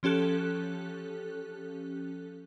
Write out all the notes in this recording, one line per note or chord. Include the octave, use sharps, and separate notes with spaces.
F3 C#4 G4 A4 F#6